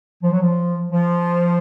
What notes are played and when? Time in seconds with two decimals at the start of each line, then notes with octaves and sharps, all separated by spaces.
0.23 F3
0.32 F#3
0.42 F3
0.92 F3